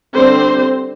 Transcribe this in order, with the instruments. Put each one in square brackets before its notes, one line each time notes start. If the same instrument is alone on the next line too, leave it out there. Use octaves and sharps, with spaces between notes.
[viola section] D3 G3 C4 D4 C5